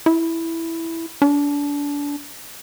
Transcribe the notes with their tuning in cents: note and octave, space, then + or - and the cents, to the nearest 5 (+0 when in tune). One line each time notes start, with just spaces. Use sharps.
E4 +0
D4 -30